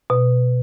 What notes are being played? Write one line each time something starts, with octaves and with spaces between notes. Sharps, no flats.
B2